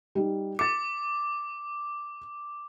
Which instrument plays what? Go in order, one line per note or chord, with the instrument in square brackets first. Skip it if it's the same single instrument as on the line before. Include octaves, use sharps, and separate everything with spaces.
[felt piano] G3 D#4
[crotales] D6 [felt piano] A6 C#7